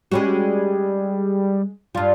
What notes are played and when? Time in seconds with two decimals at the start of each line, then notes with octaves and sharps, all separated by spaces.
0.12 G3 G#3 C#4 F#4
1.95 G2 G3 F4